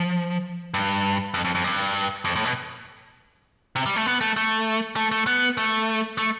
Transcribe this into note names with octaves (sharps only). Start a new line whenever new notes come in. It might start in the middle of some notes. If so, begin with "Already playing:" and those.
Already playing: F3
G2
F2
F2
F2
G2
F2
A2
B2
C3
G3
A3
B3
A3
A3
A3
A3
B3
A3
A3